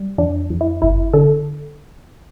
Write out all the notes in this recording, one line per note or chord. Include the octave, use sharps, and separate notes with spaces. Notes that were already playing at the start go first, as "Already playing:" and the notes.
Already playing: G3
F2 D4
F2
E4
G1 E4
D3 A4